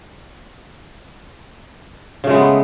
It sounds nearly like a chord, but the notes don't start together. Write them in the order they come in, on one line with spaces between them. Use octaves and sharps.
C#3 A3 G#3 B3